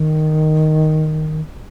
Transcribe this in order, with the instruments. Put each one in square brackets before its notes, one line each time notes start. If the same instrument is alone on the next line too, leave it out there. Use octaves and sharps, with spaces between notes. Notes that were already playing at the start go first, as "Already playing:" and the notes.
Already playing: [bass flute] D#3